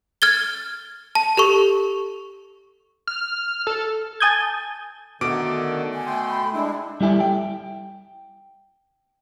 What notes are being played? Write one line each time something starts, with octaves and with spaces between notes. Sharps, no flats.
F6 G#6 A6 G7
A5
G4 A4 C#6
F6
A4
G#5 A5 D#6 G6 G#6
B2 D3 D#3 A3 D6 D7
G#5
A3 G5 C6
B5
G#3 D4 E4
G3 E4 G4 A4 E5 G#5
G5